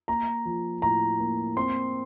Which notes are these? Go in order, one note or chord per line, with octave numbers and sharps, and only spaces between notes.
A#3 A#5
F3
A2 A#5
A#3
C4 C6